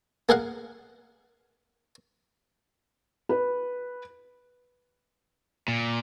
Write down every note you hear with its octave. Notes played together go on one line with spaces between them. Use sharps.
A#3 G#4 F5 F#5
B4
A#2